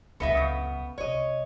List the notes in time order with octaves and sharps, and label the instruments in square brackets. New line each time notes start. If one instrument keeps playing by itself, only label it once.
[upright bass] C#2 F#2 [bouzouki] B3 [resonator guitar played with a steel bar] A4 D#5 E5
[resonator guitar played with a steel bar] C#3
[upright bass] C2 [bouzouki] C#5 D#5